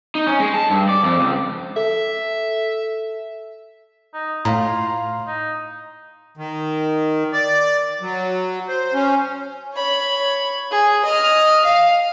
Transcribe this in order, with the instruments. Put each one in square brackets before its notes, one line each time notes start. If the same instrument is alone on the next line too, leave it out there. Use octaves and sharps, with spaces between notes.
[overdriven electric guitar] D#4
C#4
G#3
A5
G2
D5
F2
C#2
[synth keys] A4 [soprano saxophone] E5
[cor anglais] D#4
[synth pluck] A2 [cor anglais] F4 [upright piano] F5 A#5
[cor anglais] D#4
[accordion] D#3
D5
F#3
C5
C#4
[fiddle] C#5 B5
G#4
D#5 F6
F5